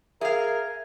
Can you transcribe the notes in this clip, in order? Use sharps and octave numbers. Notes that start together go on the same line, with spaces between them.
G#4 A#4 E5 F5 G#6